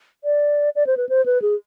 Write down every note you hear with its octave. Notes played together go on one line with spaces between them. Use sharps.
D5
D5
C5
B4
C5
B4
G#4